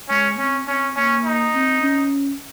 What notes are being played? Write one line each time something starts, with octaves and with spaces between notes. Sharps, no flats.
G#3 C#4
C4 C#4
C4 C#4
A#3 C#4
D#4
C4
C#4